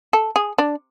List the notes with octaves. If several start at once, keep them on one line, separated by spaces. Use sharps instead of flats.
A4
G#4
D4